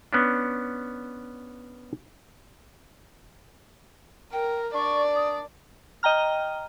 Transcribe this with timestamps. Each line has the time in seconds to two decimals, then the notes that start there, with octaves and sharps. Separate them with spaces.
0.13 B3 C#4 D4
4.33 A#4 G5
4.74 D4 D5 C#6
5.15 D#6
6.03 D#5 G5 A#5 F6